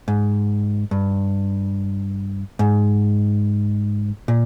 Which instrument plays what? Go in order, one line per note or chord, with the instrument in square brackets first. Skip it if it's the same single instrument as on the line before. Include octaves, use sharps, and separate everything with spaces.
[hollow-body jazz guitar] G#2
G2
G#2
A#2